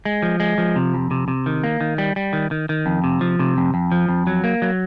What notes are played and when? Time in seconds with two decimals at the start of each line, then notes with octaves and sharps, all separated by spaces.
0.05 G#3
0.22 F3
0.40 G#3
0.58 F3
0.76 C3
0.94 F2
1.11 C3
1.28 C3
1.46 D#3
1.64 A#3
1.81 D#3
1.98 G3
2.16 G3
2.33 D#3
2.51 D#3
2.69 D#3
2.86 F2
3.04 C3
3.21 F3
3.39 C3
3.57 F2
3.74 F2
3.92 F3
4.09 F2
4.27 F#3
4.44 A#3
4.62 F#3